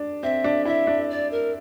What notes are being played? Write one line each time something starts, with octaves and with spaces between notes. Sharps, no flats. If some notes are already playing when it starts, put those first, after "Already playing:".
Already playing: D4
C4 E5
D4
E4 E5
D4
D5
A#4